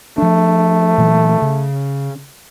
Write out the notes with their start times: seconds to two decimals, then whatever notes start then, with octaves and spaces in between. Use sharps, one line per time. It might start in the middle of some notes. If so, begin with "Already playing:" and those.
0.18 F3 A3 D4
0.98 A#2 E3 F#3
1.42 C#3